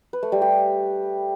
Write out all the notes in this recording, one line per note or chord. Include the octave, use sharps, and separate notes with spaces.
B4
A3
G3
G4